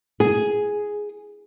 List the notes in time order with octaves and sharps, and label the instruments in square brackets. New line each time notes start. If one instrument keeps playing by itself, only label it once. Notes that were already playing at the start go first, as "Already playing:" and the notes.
[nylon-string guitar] G#4